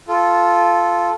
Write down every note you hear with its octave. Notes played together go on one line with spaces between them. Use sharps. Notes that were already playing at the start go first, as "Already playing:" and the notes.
F4 A4